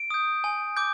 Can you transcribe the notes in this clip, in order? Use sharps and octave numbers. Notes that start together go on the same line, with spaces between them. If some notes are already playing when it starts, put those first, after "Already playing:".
Already playing: D7
D#6 G6
G#5
D6 G6